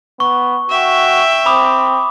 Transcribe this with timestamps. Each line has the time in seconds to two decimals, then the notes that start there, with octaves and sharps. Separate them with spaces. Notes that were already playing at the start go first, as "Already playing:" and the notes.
0.20 B3 C#6
0.70 F#4 E5 G5
1.46 C4 B5 D6 D#6